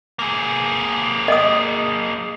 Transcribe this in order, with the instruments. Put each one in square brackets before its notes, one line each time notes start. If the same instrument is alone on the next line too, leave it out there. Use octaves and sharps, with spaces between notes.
[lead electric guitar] A#3 G#4
[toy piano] D#5 D#6